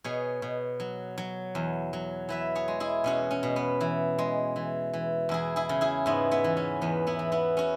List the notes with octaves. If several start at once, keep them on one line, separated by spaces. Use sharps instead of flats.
B2 G#4 C#5
B2
F#3
F#3
E2
F#3
E3 B4 E5
G#4 C#5
G#3
E4 G#4
B2 C#4 F#4
C#4
B2
B3
E3
G#3
E3
E3
E2 E4 G#4
E4 G#4
C#3
E4 G#4
G#2 B3 E4
B3 E4
E3
C#4
E2 B3
B3 E4
E3
B3 E4
C#4 F#4